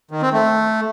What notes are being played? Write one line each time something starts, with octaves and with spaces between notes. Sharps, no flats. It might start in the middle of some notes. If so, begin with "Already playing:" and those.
D#3
C4
A3